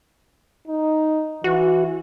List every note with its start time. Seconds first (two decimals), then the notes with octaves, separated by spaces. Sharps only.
0.68 D#4
1.44 E3 F#4